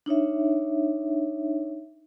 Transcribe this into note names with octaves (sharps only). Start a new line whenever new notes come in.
D4 D#4 C#5 E5